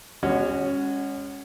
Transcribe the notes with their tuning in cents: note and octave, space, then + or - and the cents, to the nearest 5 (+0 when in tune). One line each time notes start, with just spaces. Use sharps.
G#3 -35 C#4 +0 F#4 +0